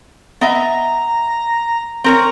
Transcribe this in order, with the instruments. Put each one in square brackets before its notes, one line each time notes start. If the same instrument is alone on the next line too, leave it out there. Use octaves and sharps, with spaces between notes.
[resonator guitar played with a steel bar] B3 D#5 E5 [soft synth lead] A#5
[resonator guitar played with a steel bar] C4 A#4 C#5 [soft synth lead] A#5